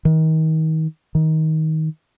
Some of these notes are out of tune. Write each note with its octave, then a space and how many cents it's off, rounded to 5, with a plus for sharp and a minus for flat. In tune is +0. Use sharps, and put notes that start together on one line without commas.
D#3 +30
D#3 +20